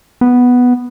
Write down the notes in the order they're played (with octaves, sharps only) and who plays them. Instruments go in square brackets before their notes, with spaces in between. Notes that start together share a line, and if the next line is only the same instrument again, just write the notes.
[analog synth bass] B3